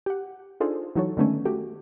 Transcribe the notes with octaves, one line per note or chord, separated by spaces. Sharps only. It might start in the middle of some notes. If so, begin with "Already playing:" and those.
G4 F#5
D4 D#4 F4 G#4 A4 C5
E3 F#3 D#4 F#4 A4 C#5
D3 D#3 G#3 A3 B3 C#4
A3 F#4 G4